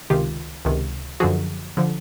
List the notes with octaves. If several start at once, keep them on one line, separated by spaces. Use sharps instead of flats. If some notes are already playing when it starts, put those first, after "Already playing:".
C#2 C3 D#3 F4 G4
C#2 C3 D#3
F#2 D3 F3 F#4 G#4
D3 F3